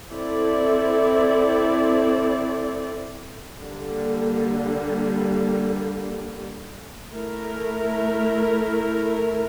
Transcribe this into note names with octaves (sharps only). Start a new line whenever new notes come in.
C4 E4 A4 D5
D3 G3 A#3
A3 E4 A#4